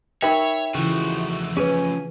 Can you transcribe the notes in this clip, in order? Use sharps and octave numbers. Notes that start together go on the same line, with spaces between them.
D#4 A#4 C#5 E5 G5 B5
C#3 E3 F3 A3 F#4
C#4 G#4 B4 G#5